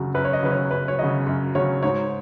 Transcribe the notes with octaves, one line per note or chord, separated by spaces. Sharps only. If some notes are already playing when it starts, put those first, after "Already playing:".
Already playing: F#2 C#3 F#3
F#2 B4
C#5
D#5
C#3 F#3 B4
C#5
F#2 B4
C#5
C#3 F#3 D#5
F#2
C#3 F#3 C#5
G#2 C#5